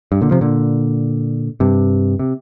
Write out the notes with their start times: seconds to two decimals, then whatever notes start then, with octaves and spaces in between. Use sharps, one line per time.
0.12 G2
0.22 A#2 D3
0.31 C3 F3
0.41 A#2 D3
1.60 G2 C3
2.19 C3